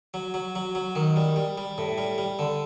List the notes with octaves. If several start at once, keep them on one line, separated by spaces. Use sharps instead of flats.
F#3
F#3
F#3
F#3
D#3
G3
G3
G3
A2
G3
G3
D3